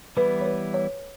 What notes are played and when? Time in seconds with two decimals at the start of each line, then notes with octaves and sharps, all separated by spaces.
0.17 E3 G3 B3 E4 B4
0.41 C#5
0.46 B4
0.74 C#5